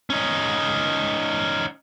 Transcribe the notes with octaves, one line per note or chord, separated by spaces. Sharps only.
C#4 D#4